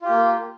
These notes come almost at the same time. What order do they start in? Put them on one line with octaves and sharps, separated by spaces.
F4 G4 A#3